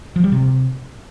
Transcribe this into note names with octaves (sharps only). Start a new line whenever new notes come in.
F3
G3
C3